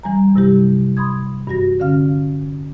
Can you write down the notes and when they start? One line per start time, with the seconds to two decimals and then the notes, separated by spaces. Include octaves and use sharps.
0.03 E3 G3 G#5 A#5
0.35 G2 C3 F#3 G3 E4 G4
0.97 B5 C6 D#6 G#6
1.47 G2 E3 F#4 A#6
1.80 D3 C#4 F5 F6